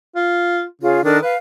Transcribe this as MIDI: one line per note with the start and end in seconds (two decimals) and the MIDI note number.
0.16 0.64 65
0.81 0.99 49
0.81 1.04 65
0.81 1.04 68
1.04 1.21 51
1.04 1.18 62
1.04 1.18 69
1.04 1.18 70
1.22 1.34 71
1.22 1.36 77